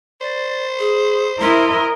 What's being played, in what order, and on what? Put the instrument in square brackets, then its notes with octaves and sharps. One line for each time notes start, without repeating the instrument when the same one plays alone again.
[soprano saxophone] C5 [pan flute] D5
[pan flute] G#4
[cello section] E4 [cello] A#4 D#5 [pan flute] C6